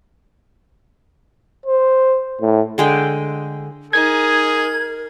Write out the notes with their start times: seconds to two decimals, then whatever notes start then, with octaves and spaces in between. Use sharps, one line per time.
1.66 C5
2.41 A2
2.78 D3 G#3 G5
3.93 D#4 G#4 A#4 G#6